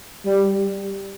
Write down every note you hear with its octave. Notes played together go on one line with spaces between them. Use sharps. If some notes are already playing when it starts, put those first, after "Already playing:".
G3